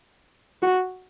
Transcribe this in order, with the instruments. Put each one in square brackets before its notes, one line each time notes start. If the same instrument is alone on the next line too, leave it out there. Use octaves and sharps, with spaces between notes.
[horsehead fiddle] F#4